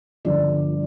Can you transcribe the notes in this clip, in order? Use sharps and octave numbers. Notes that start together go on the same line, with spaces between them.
G1 G2 D3 F3 D5